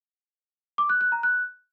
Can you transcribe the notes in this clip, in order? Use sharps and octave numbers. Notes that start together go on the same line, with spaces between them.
D6
F#6
F#6
A#5
F#6